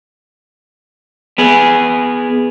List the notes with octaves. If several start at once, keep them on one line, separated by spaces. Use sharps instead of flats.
B3 G#4